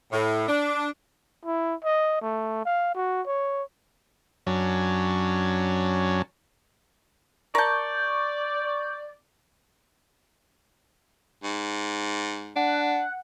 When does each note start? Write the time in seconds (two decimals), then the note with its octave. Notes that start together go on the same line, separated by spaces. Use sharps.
0.12 A2
0.48 D4
1.45 E4
1.84 D#5
2.21 A3
2.65 F5
2.95 F#4
3.27 C#5
4.47 F#2 F#3 C#4 D4
7.55 A#4 D5 A5 C#6 G6
11.43 G#2
12.56 D4 F#5